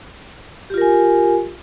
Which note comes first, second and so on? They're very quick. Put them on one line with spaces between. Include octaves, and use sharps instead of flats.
G4 F4 A#4 G#5